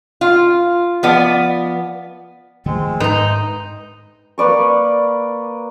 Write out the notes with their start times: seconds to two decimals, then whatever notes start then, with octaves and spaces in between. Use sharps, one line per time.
0.21 F4
1.03 F3 B3 D5
2.66 D#3 F3 G#3 A3 C4
3.00 G#2 D#4 B4 C5 A#5
4.38 A#3 B4 D5 C#6